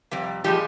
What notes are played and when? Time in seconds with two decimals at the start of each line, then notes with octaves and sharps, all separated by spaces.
0.11 F2 C3 G3
0.44 A#2 F3 G3 G#3 G4